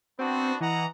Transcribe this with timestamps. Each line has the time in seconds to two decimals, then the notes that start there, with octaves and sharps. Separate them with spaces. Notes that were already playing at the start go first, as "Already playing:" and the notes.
0.19 B3 C4 D4 F#4
0.60 E3 D#5 F#5 A#5